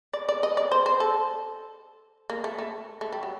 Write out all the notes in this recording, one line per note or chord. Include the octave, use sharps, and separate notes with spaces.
D5
D5
D#5
D5
C5
C5
A4
A#3
A3
A3
A3
G3
F#3